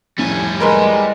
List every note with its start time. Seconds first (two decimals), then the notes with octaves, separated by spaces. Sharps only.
0.18 F1 A2 G3 G#5
0.60 G#3 A#4 B4 C6